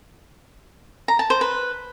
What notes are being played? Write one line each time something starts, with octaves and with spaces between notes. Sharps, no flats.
A#5
A5
C5
B4